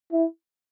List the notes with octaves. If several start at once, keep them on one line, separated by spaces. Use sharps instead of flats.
E4